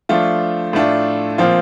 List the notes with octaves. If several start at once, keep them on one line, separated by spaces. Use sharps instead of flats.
F3 A3 D4 F4
A2 A3 D4 F4
A#2 F3 C4 F4